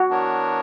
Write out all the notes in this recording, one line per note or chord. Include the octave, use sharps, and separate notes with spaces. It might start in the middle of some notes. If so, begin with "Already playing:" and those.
Already playing: F#4
E3 B3 D4 A#4 C#5